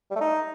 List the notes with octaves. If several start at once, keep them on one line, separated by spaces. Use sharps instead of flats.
G3
A3
D#4